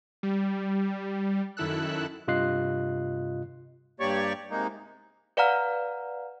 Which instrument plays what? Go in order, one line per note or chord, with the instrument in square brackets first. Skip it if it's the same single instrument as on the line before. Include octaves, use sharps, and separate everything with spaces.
[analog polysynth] G3
F#2 D#3 E4 A4 E6 F#6
[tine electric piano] G2 C3 F4 D#5 F#6 C7
[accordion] G2 A#3 G4 C#5 D5 C#6
C3 G#3 A#3 D#4
[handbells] B4 D5 F5 F#5 A#5 F6